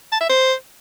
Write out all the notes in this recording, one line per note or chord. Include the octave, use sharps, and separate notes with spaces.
A5
E5
C5